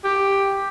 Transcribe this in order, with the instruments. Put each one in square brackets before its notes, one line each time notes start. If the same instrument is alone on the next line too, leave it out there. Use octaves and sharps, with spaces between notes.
[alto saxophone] G4